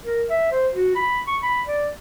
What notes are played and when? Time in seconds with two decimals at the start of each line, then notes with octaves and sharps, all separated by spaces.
0.05 A#4
0.30 E5
0.52 C5
0.74 F#4
0.96 B5
1.27 C#6
1.43 B5
1.67 D5